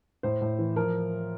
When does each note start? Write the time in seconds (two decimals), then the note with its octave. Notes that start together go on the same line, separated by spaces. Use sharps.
0.23 A2 C5
0.41 A2
0.59 E3
0.76 F3 A#4